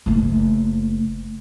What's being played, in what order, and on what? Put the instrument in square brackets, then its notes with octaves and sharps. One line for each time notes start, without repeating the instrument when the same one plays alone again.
[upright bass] F#1 A3